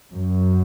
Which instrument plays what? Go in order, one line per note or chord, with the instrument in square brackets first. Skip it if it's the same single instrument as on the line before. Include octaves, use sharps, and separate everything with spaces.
[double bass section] F#2